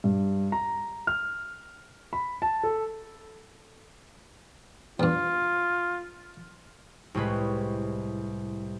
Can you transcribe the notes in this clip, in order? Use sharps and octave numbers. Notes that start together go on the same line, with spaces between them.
G2
A#5
F6
B5
A5
A4
E2 G2 F4
C2 A2 G#3 B4